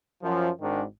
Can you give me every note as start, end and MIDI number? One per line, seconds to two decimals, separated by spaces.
0.23 0.50 42
0.23 0.50 53
0.61 0.83 32
0.61 0.83 44
0.61 0.83 51
0.61 0.83 62